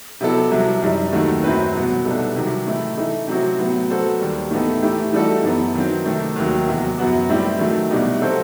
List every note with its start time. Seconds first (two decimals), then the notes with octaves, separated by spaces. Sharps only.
0.21 C3 F#3 B3 E4 A4
0.51 C2 C3 F#3
0.82 F#2 E3 G3 D#4
1.12 D#2 D#3 A3 D#4 F#4
1.43 F#2 F#3 C4 E4 B4
1.74 C2 B2 F#3 B3
2.05 C2 B2 G3 D#4 A4
2.36 C2 C3 D#3 F#3
2.67 A2 E3 A3 E4
2.97 E3 A3 D#4 A4
3.28 C3 F#3 C4 F#4
3.59 A2 F#3 B3
3.90 F#3 B3 F#4 A4 C5
4.20 D#2 D#3 G3
4.51 A2 E3 B3 D#4 A4
4.83 A2 E3 A3 E4 G4
5.13 E3 G3 D#4 F#4 A4
5.43 F#2 E3 B3
5.75 D#3 F#3 C4
6.06 C3 D#3 A3
6.36 D#2 D#3 F#3
6.67 E2 C3 F#3
6.98 F#2 F#3 B3 F#4
7.29 A2 G3 C4 E4 G4
7.59 D#3 F#3 A3
7.91 C2 B2 G3 D#4
8.21 F#3 C4 F#4 A4 C5